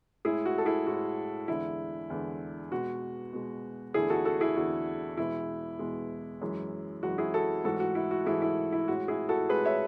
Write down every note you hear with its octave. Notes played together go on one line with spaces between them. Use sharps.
A2 G#3 E4 G#4
F#4
A4
E4 G#4
A2 G#3 F#4
E2 D3 G#3 E4
E2 D3 G#3
B2 G#3 F#4
B2 G#3
E2 D3 A3 E4 G#4
F#4 A4
F#4 A4
E4 G#4
E2 D3 A3 F#4
E2 B2 G#3 E4
E2 B2 G#3
F#2 E3 G#3
F#2 E3 G#3 F#4
E4 G#4
F#4 A4
G#2 E3 A3 F#4 A4
F#4
E4
F#4
G#2 E3 A3 E4 G#4
E4
E4
A2 G#3 F#4
E4 G#4
F#4 A4
A2 G#3 G#4 B4
C#5 E5